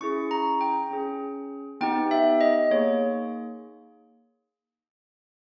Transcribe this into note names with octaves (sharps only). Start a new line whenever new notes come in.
C#4 E4 G#4 C#6
A#5
G5
C#4 G#4
B3 D#4 G4 G5
E5
D#5
A#3 D#4 G#4 C#5